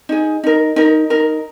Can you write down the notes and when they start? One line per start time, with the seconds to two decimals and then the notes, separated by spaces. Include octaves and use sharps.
0.09 D#4 G#4
0.44 D#4 A#4
0.76 D#4 A#4
1.10 D#4 A#4